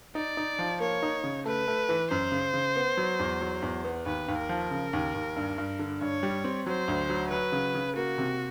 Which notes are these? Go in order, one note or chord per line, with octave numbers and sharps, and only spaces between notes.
D#4 D5
D#4
F3
A#3 C#5
D#4
C#3
A3 B4
A3
E3
F#2 C5
C#3
C#3
B3
F#3
E2
F#3
E2
B3
D#2 B4
D#2
A#4
F3
C#3
D#2
D#2
G2
G2
D3
G2 C#5
G3
C4
F#3 C5
D2
F#3
F#3 B4
C#3
C#3
A#3 F#4
C3